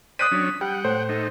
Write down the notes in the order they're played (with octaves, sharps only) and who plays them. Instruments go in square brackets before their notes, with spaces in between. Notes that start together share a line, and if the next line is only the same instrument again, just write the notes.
[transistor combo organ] C5 D5 G5 [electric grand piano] D#6 F#6 D#7 [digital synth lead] B6
[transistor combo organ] F#3 C#4 D4
[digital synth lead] G3 [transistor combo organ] F#5 G5
[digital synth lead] A2 [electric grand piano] C5
[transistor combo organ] A3 D#4